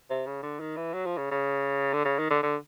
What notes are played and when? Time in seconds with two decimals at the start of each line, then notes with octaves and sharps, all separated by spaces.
0.10 C3
0.26 C#3
0.43 D3
0.60 D#3
0.77 E3
0.93 F#3
1.06 F3
1.17 C#3
1.31 C#3
1.93 D3
2.05 C#3
2.19 D#3
2.30 D3
2.43 D3